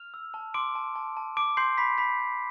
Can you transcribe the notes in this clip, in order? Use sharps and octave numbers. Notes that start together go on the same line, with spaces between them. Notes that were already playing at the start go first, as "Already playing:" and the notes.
Already playing: F6 F7
E6
A5
C6 D6 D7
A5
A5
A5
A5 D6 D7
C6 G6 C7
A5 B5 B6
B5 C6 B6
G6